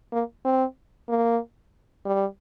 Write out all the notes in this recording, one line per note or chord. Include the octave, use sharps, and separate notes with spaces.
A#3
C4
A#3
G3